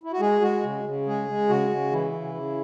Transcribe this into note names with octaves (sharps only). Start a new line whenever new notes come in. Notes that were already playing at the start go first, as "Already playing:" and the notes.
E4
F#4
G#3 G#4
G#3 F#4
C#3
C#3
G#3 G#4
G#3
C#3 F#4
C#3
E3 E4
C#3
C#3